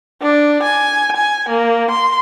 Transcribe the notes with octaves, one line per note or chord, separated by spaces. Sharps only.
D4
G#5
G#5
A#3
C6